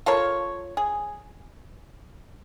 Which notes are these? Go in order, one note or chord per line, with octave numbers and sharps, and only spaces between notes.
F4 A4 A#4 C#5
G#4